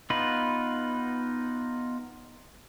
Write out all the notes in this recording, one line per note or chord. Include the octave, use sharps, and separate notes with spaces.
B3 D#4 F4 B4